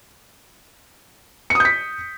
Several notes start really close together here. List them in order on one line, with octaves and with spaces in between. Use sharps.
C#7 D#6 G6 B6